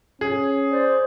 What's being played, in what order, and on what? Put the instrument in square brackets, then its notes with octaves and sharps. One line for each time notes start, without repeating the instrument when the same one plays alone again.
[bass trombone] C#4 [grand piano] G#4
[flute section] C5 D5